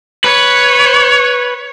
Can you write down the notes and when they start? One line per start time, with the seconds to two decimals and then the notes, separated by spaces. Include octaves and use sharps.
0.24 B4 C#5